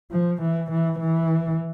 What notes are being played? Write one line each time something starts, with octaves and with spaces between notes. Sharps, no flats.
F3
E3
E3
E3